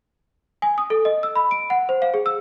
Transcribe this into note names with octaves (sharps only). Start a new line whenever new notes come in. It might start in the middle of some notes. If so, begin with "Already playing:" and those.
G#5
D#6
A4
D#5
E6
B5
D7
F#5
C5
F5
G#4
E6